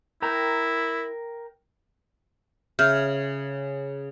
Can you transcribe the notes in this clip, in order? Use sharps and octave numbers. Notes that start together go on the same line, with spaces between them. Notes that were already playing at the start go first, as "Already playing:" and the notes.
E4 A#4 G5 A#5
C#3 E5 F6 G6